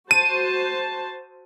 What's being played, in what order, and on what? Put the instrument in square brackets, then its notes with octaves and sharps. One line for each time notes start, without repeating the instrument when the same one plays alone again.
[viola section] F#4 C5 A5 [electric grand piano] D#7